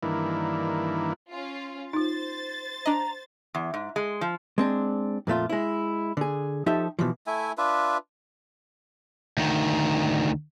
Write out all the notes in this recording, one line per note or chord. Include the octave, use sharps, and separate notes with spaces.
G2 D#3 E3 A#3 D4 E4
C#4 F4
D#4 F4 C5 A6
D4 D#5 A#5
E2
G#2
G#3
F3
G#3 C4 D4
F2 A#2 A3 F4
G#3 E4
D3 G#4
F3 D#4 G4 A4 E5
B2 E3 F3
A3 E4 E5 G#5
D4 F4 B4 E5
D2 D#3